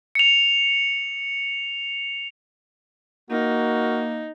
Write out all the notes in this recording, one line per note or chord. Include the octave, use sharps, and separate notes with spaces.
C#7 F7
A#3 D#4 F#4 A#4